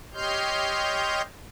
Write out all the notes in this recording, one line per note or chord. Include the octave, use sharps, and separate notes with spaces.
G4 C#5 D#5 C6 F6 G6